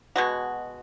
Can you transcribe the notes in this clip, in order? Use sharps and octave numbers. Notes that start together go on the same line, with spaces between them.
B2 G#3 F#4